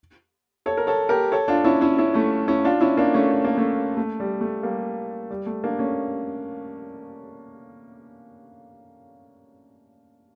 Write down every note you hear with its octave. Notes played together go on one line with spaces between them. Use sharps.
A4 C#5
A#4
A4 C#5
G4 A#4
A4 C#5
D4 F4
C#4 E4
C#4 E4
C#4 E4
A3 C#4
C#4 E4
D4 F4
C#4 E4
A#3 D4
A3 C#4
C#4
A#3
A3 C#4
A3
G3
A3
G3 A#3
G3
A3
A#3 D4
A3 C#4